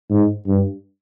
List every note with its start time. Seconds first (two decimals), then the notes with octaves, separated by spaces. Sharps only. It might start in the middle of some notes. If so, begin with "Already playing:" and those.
0.10 G#2
0.47 G2